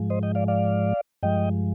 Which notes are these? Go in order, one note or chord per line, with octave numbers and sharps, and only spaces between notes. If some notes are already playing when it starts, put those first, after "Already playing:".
Already playing: G#2 F3 G#3
C5 D#5
D#5 G5
D5 F5
D5 F5
G2 F3 G#3 D#5 G5